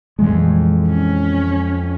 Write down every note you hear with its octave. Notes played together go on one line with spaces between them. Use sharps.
F2 A#2 E3 G#3
C#4